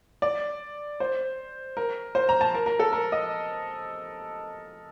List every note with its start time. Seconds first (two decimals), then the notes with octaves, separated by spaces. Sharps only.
0.22 D5
1.00 C5
1.77 A#4
2.15 C5
2.29 A#5
2.41 A5
2.54 A#4
2.66 A#4
2.79 A4
2.93 A#4
3.12 D#5